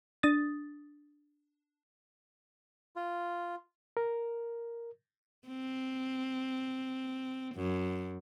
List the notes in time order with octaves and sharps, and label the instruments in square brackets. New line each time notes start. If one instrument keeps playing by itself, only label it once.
[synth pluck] D4 D#6 A6
[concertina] F4
[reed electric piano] A#4
[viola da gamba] C4
F#2